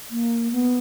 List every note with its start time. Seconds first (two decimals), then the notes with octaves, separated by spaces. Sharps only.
0.11 A#3
0.52 B3